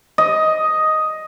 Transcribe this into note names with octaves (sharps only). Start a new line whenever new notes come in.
D#5